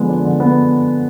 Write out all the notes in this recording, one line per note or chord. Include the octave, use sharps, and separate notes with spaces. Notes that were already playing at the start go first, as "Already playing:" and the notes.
Already playing: D3 F3 G#3 B3
D4
D3
B3